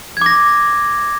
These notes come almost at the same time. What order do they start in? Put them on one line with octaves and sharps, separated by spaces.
G#6 D6 A#6